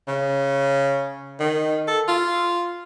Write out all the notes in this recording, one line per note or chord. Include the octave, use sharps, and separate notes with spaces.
C#3
D#3
A4
F4